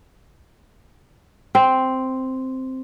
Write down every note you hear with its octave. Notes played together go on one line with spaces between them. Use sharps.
C4